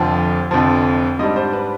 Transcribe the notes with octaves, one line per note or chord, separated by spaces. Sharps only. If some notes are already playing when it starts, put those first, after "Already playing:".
Already playing: F1 F2 D3 F3 G5
F1 F2 D3 F3
G#2 G3 D4 D#5
C5
B4